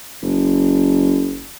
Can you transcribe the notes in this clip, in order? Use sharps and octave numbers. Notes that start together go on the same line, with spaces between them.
F#1